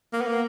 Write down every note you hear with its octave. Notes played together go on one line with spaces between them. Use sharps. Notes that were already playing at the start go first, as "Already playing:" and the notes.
A#3
B3
A#3